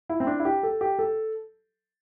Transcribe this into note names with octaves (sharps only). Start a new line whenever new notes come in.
E4
C4
D4
E4
G4
A4
G4
A4